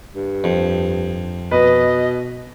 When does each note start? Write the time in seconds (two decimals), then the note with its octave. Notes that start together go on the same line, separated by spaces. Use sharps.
0.15 G2
0.44 F2
1.51 B2 B4 D#5